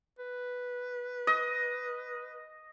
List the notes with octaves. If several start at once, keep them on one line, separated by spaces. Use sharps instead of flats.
B4
D#5